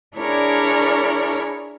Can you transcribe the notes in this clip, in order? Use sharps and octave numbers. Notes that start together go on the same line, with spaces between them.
D4 E4 G#4 A#4 C#5 D5